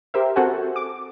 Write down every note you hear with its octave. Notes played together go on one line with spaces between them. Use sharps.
G4 A#4 C5 E5
C4 F#4 A4 C5 F#5 G#5
D6